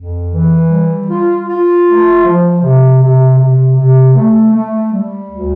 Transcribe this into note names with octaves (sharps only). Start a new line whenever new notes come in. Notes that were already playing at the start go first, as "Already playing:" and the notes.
Already playing: F2
E3
G3
F4
F4
A3
F3
C3
C3
C3
C3
A3
A3
G3
D2